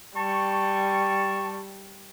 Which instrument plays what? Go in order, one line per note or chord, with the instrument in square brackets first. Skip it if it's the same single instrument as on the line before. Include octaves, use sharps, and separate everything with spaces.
[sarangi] G3 [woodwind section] A5 C#6